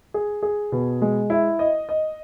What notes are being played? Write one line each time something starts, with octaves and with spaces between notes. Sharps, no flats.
G#4
G#4
B2
G#3
E4
D#5
D#5